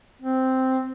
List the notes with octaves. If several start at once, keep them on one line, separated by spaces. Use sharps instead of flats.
C4